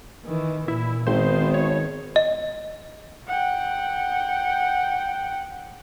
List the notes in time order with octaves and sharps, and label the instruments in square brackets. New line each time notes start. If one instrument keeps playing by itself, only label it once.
[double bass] D#3 E3
[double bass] A#2 [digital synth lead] E4
[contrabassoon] G#1 [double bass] D#3 B3 [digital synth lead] C5
[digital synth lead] C#5
[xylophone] D#5
[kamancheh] F#5 G5